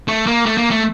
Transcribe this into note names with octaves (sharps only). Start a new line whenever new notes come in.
A3
A#3
A3
A#3
A3